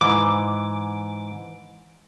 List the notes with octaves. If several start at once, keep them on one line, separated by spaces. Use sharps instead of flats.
G#2 E3 D6